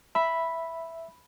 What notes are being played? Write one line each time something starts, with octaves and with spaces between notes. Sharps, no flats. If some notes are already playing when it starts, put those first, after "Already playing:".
E5 B5